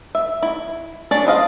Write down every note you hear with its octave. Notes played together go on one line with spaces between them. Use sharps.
E5
E4
C#4 D4 C#5 D5
C5 D#5 F5